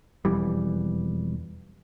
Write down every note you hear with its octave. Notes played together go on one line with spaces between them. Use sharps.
E1 F2 E3 G3